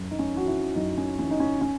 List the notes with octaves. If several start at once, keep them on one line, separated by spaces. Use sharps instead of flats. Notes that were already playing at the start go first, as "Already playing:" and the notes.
Already playing: F#2
D#4
C#4
E3 F#4
E4
F#2 D#4
C#4
E3 C#4
D#4
C#4
C#4